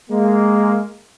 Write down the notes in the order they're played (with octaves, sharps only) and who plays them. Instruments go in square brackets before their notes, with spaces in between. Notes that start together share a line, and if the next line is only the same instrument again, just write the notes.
[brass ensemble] G#3 A#3